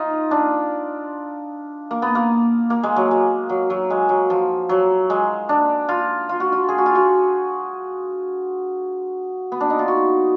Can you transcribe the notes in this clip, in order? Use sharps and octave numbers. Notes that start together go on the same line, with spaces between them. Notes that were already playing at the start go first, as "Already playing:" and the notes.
Already playing: D#4 F4
D4
A#3
B3
A#3
A#3
G#3
F#3
G#3
F#3
F#3
G#3
F#3
F3
F#3
G#3
D4
F4
F4
F#4
F4
G#4
F#4
F4
F#4
B3
D4
D#4
F4
F#4